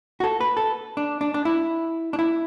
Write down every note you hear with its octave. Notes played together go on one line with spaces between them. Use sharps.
F#4
A4
B4
A4
D4
D4
D4
E4
D4
E4